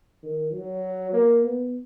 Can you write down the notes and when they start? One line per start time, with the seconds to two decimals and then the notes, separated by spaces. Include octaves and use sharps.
0.23 D#3
0.52 F#3
1.13 A#3
1.43 B3